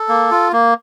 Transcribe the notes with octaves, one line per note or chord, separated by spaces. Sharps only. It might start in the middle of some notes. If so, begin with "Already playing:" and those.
Already playing: A4
A#3
F4
A#3